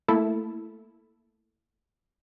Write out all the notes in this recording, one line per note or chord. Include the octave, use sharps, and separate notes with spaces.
A3 A#3 E4 A4